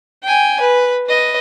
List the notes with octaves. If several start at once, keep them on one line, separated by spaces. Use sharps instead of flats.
G5 G#5
B4
B4 D#5